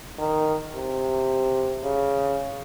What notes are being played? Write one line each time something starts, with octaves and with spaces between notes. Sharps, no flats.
D#3
C3
C#3